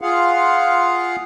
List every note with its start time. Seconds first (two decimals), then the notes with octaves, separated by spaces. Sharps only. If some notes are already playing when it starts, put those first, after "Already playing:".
0.02 F4 G#4 F5 F#5